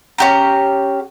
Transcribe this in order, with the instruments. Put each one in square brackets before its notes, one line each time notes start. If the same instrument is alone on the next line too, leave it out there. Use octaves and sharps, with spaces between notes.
[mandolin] C#4 G4 A#5